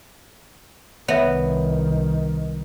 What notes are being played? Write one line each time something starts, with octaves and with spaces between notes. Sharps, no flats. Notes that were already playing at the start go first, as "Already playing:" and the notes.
C2 D#3 B3 C#5 E5